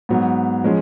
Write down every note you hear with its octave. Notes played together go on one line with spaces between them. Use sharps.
G#2 F#3 B3
F3 G#3 C#4 G#4